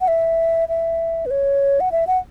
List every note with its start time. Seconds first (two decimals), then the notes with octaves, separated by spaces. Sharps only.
0.01 F#5
0.08 E5
0.69 E5
1.26 B4
1.31 C#5
1.80 F#5
1.92 E5
2.07 F#5